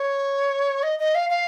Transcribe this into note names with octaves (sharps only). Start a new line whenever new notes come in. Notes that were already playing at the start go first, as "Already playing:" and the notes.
Already playing: C#5
D#5
D#5
F5
F5